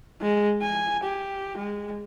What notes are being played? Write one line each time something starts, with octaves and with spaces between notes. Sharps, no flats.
G#3
G#5
G4
G#3